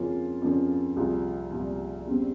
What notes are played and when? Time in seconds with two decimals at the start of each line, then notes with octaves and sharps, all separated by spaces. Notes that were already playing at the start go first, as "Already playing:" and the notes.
Already playing: F2 C#3 F3 A#3 C#4 F4 G#4
0.42 F2 C#3 F3 A#3 C#4
0.96 C2 A#2 F3 F4 G#4
1.52 C2 A#2 F3
2.07 E2 C#3 G3 C4